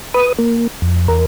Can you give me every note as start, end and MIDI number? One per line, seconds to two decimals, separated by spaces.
0.14 0.33 71
0.14 0.33 87
0.39 0.67 58
0.82 1.08 41
1.08 1.26 40
1.08 1.26 70